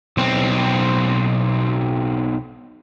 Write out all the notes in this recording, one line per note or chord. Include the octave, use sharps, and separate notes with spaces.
B1 C4